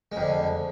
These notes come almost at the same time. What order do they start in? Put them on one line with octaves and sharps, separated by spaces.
G#3 F2 D3